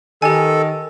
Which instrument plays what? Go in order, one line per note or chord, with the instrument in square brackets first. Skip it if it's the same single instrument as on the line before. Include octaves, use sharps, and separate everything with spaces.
[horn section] D#3 [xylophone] G4 G#5 [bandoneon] A4